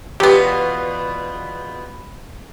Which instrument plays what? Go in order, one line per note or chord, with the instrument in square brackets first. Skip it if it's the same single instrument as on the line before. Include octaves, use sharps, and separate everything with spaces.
[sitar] E2 B2 F4 [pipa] F#3 B3 [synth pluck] G4